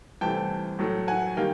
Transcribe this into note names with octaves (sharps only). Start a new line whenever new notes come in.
C2 C3 E3 A3 G5 A5
A2 F#3 A3
F#5 G#5
D#3 G3 A#3 F5 G5